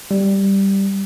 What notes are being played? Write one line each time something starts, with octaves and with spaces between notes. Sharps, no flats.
G3